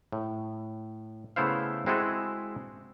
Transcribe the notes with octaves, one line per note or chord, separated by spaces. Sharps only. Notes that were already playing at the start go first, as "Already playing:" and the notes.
A2
C#3 A3 B3 E4 C5 F5
G#3 C4 E4 F#4 G#4 A4